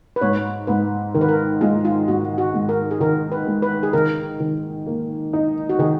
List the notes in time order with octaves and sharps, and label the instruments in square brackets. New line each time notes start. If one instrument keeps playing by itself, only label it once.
[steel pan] B4
[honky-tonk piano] G#2 [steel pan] C#5
[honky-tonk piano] G#2 [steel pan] B4
[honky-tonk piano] D#3 [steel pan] A#4
[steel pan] B4
A#4
[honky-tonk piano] G#3 [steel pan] F4
[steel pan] F4
[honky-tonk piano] G#2 [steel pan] F#4
[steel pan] F#4
[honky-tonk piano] G#2
[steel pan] A#4
G#4
[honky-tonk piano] D#3 [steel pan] A#4
[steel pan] B4
[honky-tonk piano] G#3
[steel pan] B4
G#4
[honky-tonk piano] D#3 [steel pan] A#4
[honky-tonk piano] D#3
A#3
D#4
[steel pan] F#4
[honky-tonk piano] D#3 [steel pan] G#4